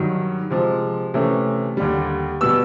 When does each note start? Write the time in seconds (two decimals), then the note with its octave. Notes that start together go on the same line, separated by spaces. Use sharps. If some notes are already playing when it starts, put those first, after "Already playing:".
Already playing: G2 D#3 F#3
0.50 C3 F3 G#3
1.14 C3 E3 A3 C#4
1.77 D#2 D3 G3
2.41 B2 G3 B3 E6